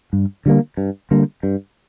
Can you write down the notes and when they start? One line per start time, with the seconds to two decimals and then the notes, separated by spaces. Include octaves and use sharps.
0.13 G2
0.46 D3 G3 A#3
0.77 G2
1.11 D3 G3 A#3
1.43 G2